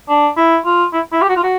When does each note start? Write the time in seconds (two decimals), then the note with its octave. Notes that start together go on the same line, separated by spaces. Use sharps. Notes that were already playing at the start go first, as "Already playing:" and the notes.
0.09 D4
0.37 E4
0.65 F4
0.93 E4
1.12 E4
1.22 G4
1.29 F#4
1.36 F4
1.43 F#4